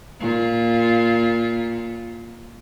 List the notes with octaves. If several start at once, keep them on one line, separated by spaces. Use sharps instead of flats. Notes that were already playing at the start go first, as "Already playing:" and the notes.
A#2 F4